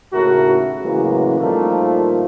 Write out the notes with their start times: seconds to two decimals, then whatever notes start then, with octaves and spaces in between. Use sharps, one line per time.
0.13 D#2 A2 C#3 E4 F#4 A#4
0.82 A2 C#3 E3 F#3 G#3 A#3
1.39 A#2 D#3 F3 G3 A3 A#3